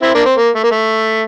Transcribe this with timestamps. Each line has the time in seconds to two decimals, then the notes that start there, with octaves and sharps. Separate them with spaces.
0.02 C4 E4
0.15 A#3 D4
0.26 C4
0.37 A#3
0.55 A3
0.63 A#3
0.71 A3